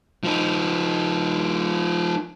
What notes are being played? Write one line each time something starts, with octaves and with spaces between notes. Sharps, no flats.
F3 D#4